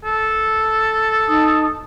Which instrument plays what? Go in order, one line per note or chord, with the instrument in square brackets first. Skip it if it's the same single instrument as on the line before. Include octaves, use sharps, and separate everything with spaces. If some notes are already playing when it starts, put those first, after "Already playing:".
[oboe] A4
[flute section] D#4 A5 D#6